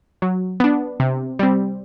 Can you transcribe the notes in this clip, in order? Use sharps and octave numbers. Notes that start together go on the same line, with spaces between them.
F#3
B3 D4
C3
G3 C4